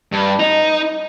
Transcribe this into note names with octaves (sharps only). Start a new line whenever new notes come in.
G2
D#4